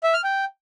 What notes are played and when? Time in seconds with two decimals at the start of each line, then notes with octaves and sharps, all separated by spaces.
0.03 E5
0.14 F6
0.24 G5